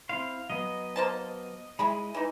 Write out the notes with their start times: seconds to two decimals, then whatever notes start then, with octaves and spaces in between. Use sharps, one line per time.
0.09 C4 E4 F5 C6
0.50 F#3 B3 D#5
0.96 A#3 C5 A5
1.79 G#3 E4 G#4 B5
2.14 E3 D#4